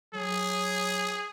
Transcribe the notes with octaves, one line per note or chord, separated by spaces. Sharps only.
F#3 G#4